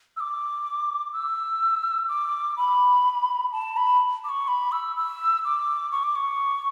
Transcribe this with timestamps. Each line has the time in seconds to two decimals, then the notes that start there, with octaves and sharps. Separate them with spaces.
0.17 E6
0.20 D6
1.13 E6
2.08 D6
2.57 B5
3.52 A5
3.77 B5
4.24 D6
4.29 C#6
4.48 B5
4.72 E6
4.96 E6
5.44 D6
5.92 C#6
6.03 D6
6.15 C#6